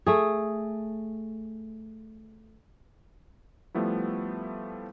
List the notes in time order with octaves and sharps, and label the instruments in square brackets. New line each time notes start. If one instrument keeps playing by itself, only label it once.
[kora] A3 G#4
[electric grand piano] F3 G3 A3 B3 E4